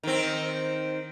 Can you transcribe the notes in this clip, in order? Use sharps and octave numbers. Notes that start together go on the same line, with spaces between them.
D#3 C4